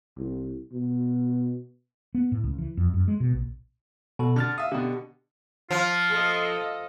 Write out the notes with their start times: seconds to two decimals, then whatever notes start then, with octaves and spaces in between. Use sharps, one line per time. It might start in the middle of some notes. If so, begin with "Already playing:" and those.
0.18 C2
0.73 B2
2.15 B3
2.32 A2
2.44 C#2
2.58 E3
2.77 F2
2.94 F#2
3.08 G#3
3.20 B2
3.33 A#1
4.19 B2 A4
4.36 D3 A5 F6 A6
4.58 E5 F5 D#6
4.72 B2 D3 G4
5.71 F3 F4
6.10 A4 D#5